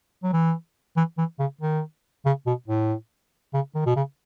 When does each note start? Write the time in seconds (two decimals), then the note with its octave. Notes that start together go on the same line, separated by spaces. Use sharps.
0.23 F#3
0.33 E3
0.97 E3
1.18 E3
1.39 C#3
1.61 D#3
2.25 C#3
2.46 B2
2.68 A2
3.54 C#3
3.75 D#3
3.86 B2
3.96 C#3